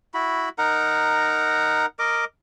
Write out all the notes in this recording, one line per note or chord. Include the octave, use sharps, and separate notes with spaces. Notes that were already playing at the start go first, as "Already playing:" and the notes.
E4 F#4 B5
D#4 A#4 F#5 A#5
A#4 D#5 D6